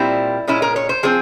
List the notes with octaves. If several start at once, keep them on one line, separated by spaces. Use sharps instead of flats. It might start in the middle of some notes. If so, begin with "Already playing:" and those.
Already playing: A#2 G3 C4 E4
A#2 G#3 C#4 E4
A#4
C#5
C5
F3 C4 G#4